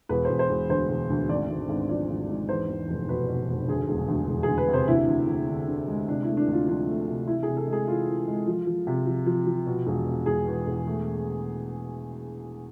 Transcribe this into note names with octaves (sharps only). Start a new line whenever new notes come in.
E1 B4
E1 C5
C5
E1
D2 C5
E1
D2
G#1 D5
G#1
G#1
F3 D5
G#1
G#2
E2 C5
E2
F1
B2 B4
B2
F1
D2 G#4
E1
D2
E1
D2 G#4
B4
C3
C5
D2 E4
D2
D2
D3
D3
G#3
C3 D4
E4
A3
D4
D2
F4
F3 D4
A3
C3
E3 E4
C3 G#4
A4
G#3
G#4
E3 F4
E3
G#3
F3
F3
C3
F3
F3
F3
B2
E1
B2
E1 G#4
E2
E1
A3